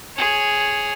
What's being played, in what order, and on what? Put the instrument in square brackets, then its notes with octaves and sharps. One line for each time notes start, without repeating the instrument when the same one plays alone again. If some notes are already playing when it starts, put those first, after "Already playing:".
[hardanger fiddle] G#4 C#5